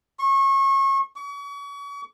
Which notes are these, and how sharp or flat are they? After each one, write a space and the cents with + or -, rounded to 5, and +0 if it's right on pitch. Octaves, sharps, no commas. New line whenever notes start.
C#6 -30
C#6 +40